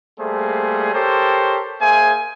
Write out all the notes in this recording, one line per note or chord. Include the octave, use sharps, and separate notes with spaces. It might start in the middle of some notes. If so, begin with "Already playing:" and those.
G3 A3 A#3 G#4 A4 C5
G4 A4 A#4 C5 C#5
A#3 G#4 C5 E5 G#5